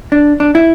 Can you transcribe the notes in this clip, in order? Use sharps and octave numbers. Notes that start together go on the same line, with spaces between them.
D4
D4
E4